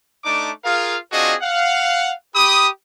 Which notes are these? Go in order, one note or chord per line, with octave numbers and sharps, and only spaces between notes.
A3 D4 D#4 D6
F4 G#4 A#4 F5
C4 D4 F4 F#4 G#4 D#5
F5 F#5
G4 B5 D#6